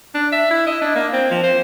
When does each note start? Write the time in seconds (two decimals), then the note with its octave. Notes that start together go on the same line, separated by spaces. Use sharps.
0.15 D4
0.33 E5
0.51 E4
0.66 D#5
0.81 D4
0.95 A#3
1.13 C4
1.31 F3
1.43 C5